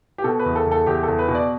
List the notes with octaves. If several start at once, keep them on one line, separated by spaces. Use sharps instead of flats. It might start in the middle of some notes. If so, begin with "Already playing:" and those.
G4
B2 A4
B4
E2
A4
E2
A4
E2 G4
A4
E2
B4
B2
D5